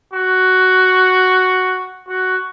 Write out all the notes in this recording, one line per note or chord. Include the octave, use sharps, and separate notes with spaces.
F#4
F#4